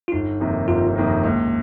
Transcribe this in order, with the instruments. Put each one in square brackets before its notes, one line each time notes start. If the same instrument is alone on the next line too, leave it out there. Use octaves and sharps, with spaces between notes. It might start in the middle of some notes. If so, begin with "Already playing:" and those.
[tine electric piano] F4
[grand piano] G1 [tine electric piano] D#4
[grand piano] F2 C3 D#3 A#3
[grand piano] G1 [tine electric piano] F4
[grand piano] F2 C3 D#3 A#3
[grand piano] C#2 [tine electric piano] A#3